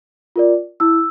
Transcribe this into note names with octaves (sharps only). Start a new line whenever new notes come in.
F4 A#4 D5
E4 E6